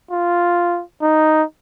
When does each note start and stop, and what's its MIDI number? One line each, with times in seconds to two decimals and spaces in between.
0.11 0.83 65
1.02 1.43 63